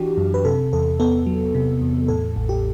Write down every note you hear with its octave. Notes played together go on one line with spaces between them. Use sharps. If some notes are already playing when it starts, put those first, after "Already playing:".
Already playing: E3 D4 F#4 G4
F#2
B4
C3 A4
E2 A4
B3 A4
F#3
C3
E2
A2 A4
A1
G4